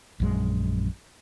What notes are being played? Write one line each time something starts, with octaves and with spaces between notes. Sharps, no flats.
A#1 F#2 G#3